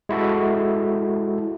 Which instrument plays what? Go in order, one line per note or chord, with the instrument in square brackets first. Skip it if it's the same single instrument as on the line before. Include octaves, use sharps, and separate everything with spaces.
[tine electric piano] G#3 E4 F#4 A4